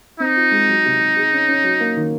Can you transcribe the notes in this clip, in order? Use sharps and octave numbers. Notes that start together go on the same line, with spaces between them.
C4 D#4
F4
G#3
F#3
C3
C3
G#4
C#4
C#4
F#3
A#3
D#3